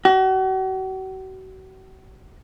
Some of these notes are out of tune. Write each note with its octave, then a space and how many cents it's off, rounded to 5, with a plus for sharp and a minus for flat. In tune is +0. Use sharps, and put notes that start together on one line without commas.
F#4 +40